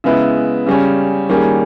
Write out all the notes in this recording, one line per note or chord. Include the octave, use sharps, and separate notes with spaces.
C#3 G#3 B3 E4
C#3 G3 C#4
D#3 G3 A#3 C#4 G#4